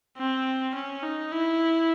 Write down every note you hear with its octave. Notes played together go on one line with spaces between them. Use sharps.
C4
C#4
D#4
E4